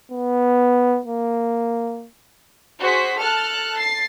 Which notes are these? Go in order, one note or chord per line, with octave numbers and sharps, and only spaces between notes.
B3
A#3
F#4 G#4 C5 B6
A4 A5 F6 F#6
A6 C7